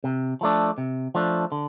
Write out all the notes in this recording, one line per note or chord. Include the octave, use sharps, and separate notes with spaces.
C3
F3 A3 D4
C3
F3 A3 D4
D3